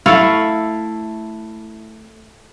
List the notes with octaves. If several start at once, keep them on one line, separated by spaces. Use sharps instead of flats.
A3 E4 F5